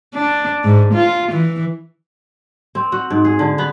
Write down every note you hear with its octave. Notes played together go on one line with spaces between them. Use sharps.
D4
G#2
F4
E3
C4
F#4
G#2
G#4
D3
B3